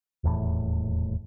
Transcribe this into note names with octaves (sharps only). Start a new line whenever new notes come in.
D#1 E2 A2